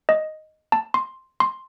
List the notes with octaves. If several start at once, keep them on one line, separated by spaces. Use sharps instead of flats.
D#5
A5
C6
C6